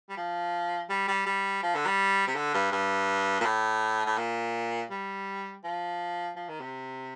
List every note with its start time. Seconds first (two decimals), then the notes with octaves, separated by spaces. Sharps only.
0.09 G3
0.17 F3
0.89 G3
1.08 G3
1.26 G3
1.63 F3
1.75 D3
1.86 G3
2.27 C3
2.35 D3
2.54 G2
2.72 G2
3.40 A#2
3.44 A2
4.06 A2
4.17 A#2
4.90 G3
5.64 F3
6.36 F3
6.49 D#3
6.60 C3